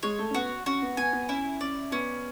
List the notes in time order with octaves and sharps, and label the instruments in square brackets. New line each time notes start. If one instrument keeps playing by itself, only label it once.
[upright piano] G#3 [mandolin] C#5
[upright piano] A3
C#4
[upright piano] B3 [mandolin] F#4
[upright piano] C#4 [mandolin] F#4
[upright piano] B3
[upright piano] B3 [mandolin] G#5
[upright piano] B3
[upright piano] C#4 [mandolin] E4
[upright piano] C#4 [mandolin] D5
[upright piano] B3 [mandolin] C#4